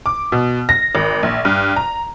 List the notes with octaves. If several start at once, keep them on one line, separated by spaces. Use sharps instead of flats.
D6
B2
A#6
G#1
A#1
G2
A#5